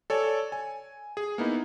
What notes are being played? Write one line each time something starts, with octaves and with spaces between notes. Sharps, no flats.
A4 C#5 D5 G#5
G#5
G#4
A#3 B3 D#4 E4